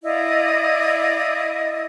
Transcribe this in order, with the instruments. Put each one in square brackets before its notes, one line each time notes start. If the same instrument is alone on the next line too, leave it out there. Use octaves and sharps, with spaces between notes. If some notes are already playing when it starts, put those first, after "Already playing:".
[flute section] E4 D5 D#5 F5